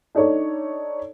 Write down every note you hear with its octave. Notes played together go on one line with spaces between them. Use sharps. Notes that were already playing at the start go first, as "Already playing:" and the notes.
D4 D#4 A4 C#5 D5